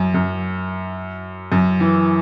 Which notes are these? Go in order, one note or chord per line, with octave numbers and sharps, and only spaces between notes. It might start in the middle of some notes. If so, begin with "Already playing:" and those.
Already playing: F#2
F#2
F#2
E3